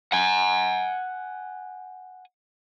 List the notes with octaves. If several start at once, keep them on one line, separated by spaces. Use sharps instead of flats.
F#5 G#5